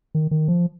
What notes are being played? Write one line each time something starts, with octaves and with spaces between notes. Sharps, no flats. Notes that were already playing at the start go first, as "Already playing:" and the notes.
D#3
D#3
F3